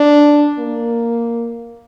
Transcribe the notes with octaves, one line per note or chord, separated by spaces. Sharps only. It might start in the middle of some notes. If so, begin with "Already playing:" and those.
Already playing: D4
A#3